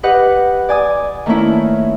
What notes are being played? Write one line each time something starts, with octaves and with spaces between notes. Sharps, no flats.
G4 B4 D#5 F#5
D5 G#5 D#6
D#3 A3 A#3 C#4 E4